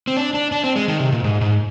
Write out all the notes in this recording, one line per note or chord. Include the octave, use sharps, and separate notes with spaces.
C4
D4
D4
D4
C4
G#3
D#3
C3
A#2
G#2
G#2